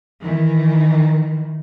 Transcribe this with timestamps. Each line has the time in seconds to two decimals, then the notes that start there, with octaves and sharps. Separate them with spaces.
0.21 D#3 E3